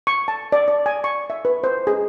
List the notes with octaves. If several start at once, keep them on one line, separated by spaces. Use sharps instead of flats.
C#6
A5
D5
D5
G#5
C#6
E5
B4
C5
G#4